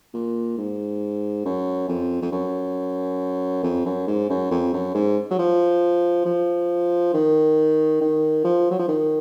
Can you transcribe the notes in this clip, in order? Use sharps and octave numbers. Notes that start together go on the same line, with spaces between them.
A#2
G#2
F#2
F2
F2
F#2
F2
F#2
G#2
F#2
F2
F#2
G#2
F#3
F3
F3
D#3
D#3
F3
F#3
F3
D#3